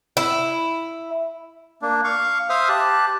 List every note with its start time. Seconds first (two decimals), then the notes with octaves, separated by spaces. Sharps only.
0.17 E4
1.82 A#3 D4
2.04 F5 C#6
2.50 C5 E5 F5 D#6 F6
2.69 G4 A5 F#6